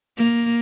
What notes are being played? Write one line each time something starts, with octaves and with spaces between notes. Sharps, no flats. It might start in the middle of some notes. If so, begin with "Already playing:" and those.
A#3